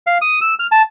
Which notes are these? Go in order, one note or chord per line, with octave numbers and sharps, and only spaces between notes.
F5
D#6
E6
F6
A5